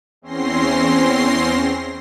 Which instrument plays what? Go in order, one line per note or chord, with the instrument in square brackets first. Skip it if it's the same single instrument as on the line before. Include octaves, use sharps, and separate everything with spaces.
[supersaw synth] E2 C4 C#4 C6 A#6 C7